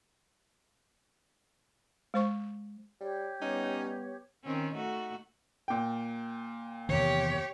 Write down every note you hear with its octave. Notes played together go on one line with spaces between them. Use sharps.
G#3 C5 C#6
G3 G4 C#5
G3 B3 C#4 D#4
D#3 C4 C#4
A3 D#4 F#4
A#2 G5
E2 C3 D#3 G4 C#5